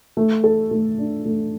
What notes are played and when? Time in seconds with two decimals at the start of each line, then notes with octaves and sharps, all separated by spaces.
0.17 A3
0.44 A4
0.71 A3
0.98 D4
1.26 A3